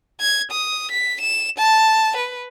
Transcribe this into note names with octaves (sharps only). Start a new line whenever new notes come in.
G#6
D#6
B6
E7
A5
B4